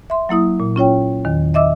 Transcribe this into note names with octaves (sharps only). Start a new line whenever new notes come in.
E5 C6
F#3 A#3 E4 D#6
A#2
C#4 F4 C#5 G5
E2 D#3
D#5 E5 D6 E6